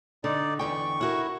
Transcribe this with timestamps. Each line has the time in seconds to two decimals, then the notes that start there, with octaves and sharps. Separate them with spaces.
0.24 D3 D#4 D5
0.59 E2 D3 G5 C#6
1.01 E4 F#4 A#4